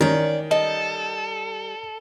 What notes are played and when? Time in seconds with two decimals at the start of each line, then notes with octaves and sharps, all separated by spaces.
0.01 D#3 C#4 C#5 D5 A#5
0.51 G3 A4 D#5